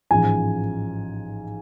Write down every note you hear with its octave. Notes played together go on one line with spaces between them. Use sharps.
A1 G#2 F3 G#5